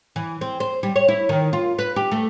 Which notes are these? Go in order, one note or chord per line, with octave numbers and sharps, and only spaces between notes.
E3
C4
C5
G3
C#5
E4
D#3
F4
B4
G4
A3